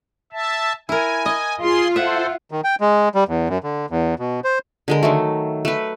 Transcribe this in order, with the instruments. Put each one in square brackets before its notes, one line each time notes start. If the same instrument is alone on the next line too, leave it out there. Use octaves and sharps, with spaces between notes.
[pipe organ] E5 A5
[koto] E4 A#4 [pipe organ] G#5
[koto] D#5
[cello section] F4 [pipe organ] G#4 C6
[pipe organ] A4 C5 [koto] E5 F#5
[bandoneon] D#3
G5
G#3
G3
E2
F#2
D3
E2
B2
C5
[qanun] D3 G#3 A#4
D#3 F#3 A3
A3 B4